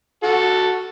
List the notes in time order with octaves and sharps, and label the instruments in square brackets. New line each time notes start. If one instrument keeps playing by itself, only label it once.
[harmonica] F#4 A4